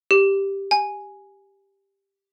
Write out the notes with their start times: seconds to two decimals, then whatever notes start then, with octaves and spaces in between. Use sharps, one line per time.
0.11 G4
0.71 G#5